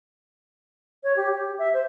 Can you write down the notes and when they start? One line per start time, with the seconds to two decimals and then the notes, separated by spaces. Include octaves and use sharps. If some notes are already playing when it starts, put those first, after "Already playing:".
1.04 C#5
1.17 G4
1.32 G4
1.59 E5
1.74 C5